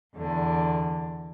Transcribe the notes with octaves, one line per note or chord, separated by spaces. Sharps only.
E2 D3